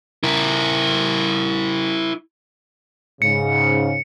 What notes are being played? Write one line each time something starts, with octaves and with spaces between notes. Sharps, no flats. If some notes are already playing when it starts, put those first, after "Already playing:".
E4 A#4
G#2 C#3 C#7